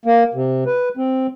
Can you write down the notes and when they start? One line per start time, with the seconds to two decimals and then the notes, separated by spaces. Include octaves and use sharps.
0.06 A#3
0.34 C3
0.66 B4
0.97 C4